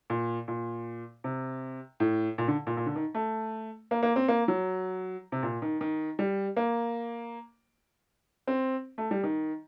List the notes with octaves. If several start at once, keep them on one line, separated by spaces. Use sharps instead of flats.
A#2
A#2
C3
A2
A#2
D3
A#2
A#2
D3
D#3
A3
A#3
A#3
C4
A#3
F#3
C3
A#2
D#3
D#3
G3
A#3
C4
A3
G3
D#3